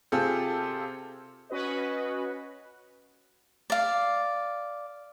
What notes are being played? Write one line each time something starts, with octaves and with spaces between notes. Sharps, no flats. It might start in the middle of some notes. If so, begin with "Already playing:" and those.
C3 C4 F4 G#4 A4
C#4 F#4 B4 D#5
D5 F5